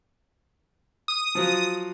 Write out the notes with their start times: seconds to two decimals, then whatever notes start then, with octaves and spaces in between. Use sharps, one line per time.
1.08 D#6
1.35 F3 F#3 F4